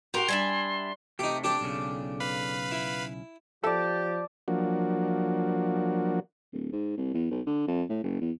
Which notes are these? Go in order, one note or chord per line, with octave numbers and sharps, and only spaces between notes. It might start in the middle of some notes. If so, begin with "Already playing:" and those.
F#4 G4 A#4 G5 C6
G3 D4 E5 G#5
C3 A3 D#4 G4
D4 G4 A4
B1 C#3
B4 F5 B5
E4
F3 G4 A4 D5 E5 A5 E7
F3 F#3 A#3 D4 F#4
D1
G#2
C2
E2
B1
D3
F2
A2
F#1
E2